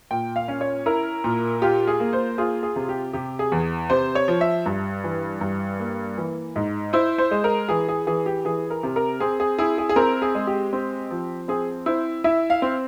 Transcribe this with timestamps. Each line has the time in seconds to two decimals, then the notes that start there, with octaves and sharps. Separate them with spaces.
0.11 A#2 G5
0.36 F5
0.48 C#4
0.61 C#5
0.86 E4 A#4
1.24 A#2
1.62 F4 G4
1.87 G#4
2.00 A#3
2.13 C5
2.38 F4 G#4
2.63 G#4
2.76 C3
2.89 G4
3.13 C3 G4
3.39 G#4
3.52 E2
3.90 C3 C5
4.15 C#5
4.28 F3
4.41 E5
4.66 G2
5.04 E3
5.41 G2
5.80 A#3
6.18 E3
6.56 G#2
6.93 E4 C5
7.18 C5
7.31 G#3
7.44 A#4
7.69 E3 G#4
7.89 G#4
8.07 E3 G#4
8.26 G4
8.45 E3 G#4
8.70 A#4
8.83 C3
8.96 A#4
9.20 C4 G#4
9.40 G#4
9.59 E4 G#4
9.78 G#4
9.89 G#4
9.96 C4 A#4
10.22 G#4
10.35 G#3
10.47 G4
10.73 C4
11.11 F3
11.48 C4 G#4
11.86 E4 C5
12.24 E4 E5
12.50 F5
12.62 C4